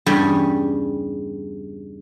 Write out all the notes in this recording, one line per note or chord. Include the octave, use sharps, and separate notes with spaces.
E2 G2 C#3 G3 C#5 G#5